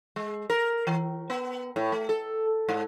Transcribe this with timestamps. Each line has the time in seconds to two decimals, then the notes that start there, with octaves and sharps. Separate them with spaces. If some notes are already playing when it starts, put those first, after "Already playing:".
0.16 G#3
0.50 A#4
0.87 E3
1.30 B3
1.76 A2
1.92 A3
2.09 A4
2.69 G#2